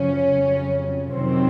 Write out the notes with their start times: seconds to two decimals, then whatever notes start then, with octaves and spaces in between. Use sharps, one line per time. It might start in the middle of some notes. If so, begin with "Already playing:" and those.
Already playing: F#2 C#3 F3 C#4
0.29 F2 C#3 F#3
1.12 F2 C3 D#3 F#3 C4